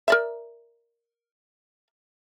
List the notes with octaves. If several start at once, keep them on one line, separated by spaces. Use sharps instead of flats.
A#4 D5 E5